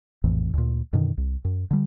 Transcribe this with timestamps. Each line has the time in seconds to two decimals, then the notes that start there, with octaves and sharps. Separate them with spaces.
0.24 A#1 F2 A2 E3
0.53 D2 A#2
0.93 F#2 B2 D3 D#3
1.17 C2
1.45 F#2
1.71 D3 G3